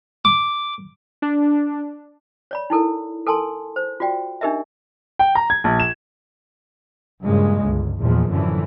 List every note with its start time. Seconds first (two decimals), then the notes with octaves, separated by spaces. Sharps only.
0.25 D6
1.22 D4
2.51 C#5 D5 B5
2.70 D#4 E4 A4 A#4
3.27 A4 A#4 G#5 A5 C6
3.76 C5
4.00 F4 F#4 D5 G5
4.41 D4 D#4 G4 A#4 D#5 E5
5.19 G5
5.35 A#5
5.50 G#6
5.64 A#1
5.80 E7
7.22 G2 A#2 C#3 G#3
7.64 G1 C#2
8.00 A#1 E2 A#2 F3 G#3
8.30 F#2 A2 D3 E3 F3